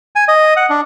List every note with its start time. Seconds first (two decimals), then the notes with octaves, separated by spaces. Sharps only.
0.16 G#5
0.28 D#5
0.57 F#5
0.70 D4